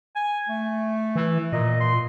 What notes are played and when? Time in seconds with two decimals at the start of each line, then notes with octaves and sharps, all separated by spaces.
0.16 G#5
0.49 A3
1.16 E3
1.52 A#2 D#5
1.80 C6